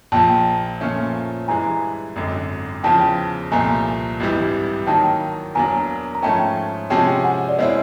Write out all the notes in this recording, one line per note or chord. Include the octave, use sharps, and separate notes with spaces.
A#1 A#2 F3 G5 A5
A#2 F3 A3 C#4
G2 E3 G#3 G#5 A#5
G#1 F#2 D3
E2 C#3 F3 G5 A5
C2 A#2 F3 A3 G#5 A#5
G#1 G2 E3 G3
D#3 F#3 A#3 D#4 G5 A5
E2 B2 F#3 A#3 D4 G#5 A#5
A#5
G#2 F3 A3 C#4 G5 A5
C3 F3 G#3 C#4 F#4 G5 A5
F#5 G#5
D5
B2 G#3 C4 E4 C#5 D#5